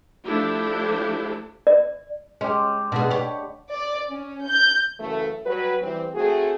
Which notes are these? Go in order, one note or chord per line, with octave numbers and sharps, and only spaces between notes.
F3 A3 D4 E4 G4
D5
G#3 C#4 G4
B2 D3 B3 G#4
G4 C#5
D5
C#4
G6
F#2 C#3 E3 A3
F#3 G3 F#4 B4
E3 G3 C4
A3 C4 F#4 G#4